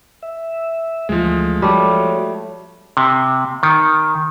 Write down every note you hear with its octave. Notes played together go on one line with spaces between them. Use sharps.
E5
D2 E3 F3 G#3 A3
G3 A3 F#4 C#5
C3
D#3